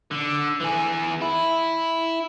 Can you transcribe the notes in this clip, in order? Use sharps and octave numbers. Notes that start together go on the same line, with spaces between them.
D3
E3 G#4
E4